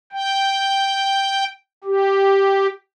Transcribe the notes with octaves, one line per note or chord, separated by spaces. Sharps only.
G5
G4